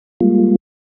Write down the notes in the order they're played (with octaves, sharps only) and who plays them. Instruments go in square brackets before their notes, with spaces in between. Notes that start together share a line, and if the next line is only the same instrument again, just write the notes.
[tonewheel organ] G3 G#3 A#3 F4